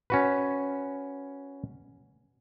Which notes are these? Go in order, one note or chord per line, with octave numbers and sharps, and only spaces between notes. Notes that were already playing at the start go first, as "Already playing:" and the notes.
C#4 F#4 B4